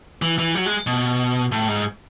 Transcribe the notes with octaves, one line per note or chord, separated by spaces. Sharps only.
E3
E3
F#3
G#3
B2
A2
G#2